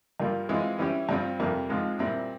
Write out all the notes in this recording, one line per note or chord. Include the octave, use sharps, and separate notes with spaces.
G2 G3 A#3 F4
E3 G#3 C4 F4
E3 G3 C#4 E4 G4
G2 G3 C4 F4
F2 C3 G3 A#3
G#2 F3 G#3 C4 F4
A#2 G3 C4 E4